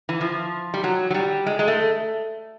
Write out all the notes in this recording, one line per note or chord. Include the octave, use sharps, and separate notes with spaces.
E3
F3
G3
F#3
F#3
G3
G#3
G#3
A3